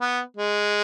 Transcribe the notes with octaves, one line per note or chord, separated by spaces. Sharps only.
B3
G#3